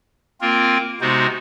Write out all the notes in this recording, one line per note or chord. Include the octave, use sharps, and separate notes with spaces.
A#3 C4 F4 A#4
C3 G#3 B3 D#4 F#4 C5